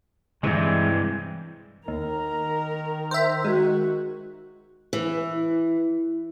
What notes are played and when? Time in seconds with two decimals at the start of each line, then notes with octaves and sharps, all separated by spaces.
0.43 G2 C3 E3 G#3
1.88 D#2 D#3 A#4 A#5
3.11 C5 E5
3.45 G#3 F#4
4.93 E3